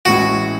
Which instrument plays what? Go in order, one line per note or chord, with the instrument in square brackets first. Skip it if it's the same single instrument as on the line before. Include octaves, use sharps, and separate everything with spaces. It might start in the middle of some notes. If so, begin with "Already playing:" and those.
[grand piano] A1 A2 G#3 C#4 E4 [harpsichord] F#4